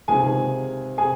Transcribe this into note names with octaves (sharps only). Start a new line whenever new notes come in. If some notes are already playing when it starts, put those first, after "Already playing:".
C#2 C3 D#3 G#4 G#5
C3 G#4 G#5